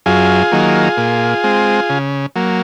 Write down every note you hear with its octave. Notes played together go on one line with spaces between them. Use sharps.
F#2 F4 G#4
D#3 F#3 A#3
A#2
G#3 C4
C#3
F#3 A#3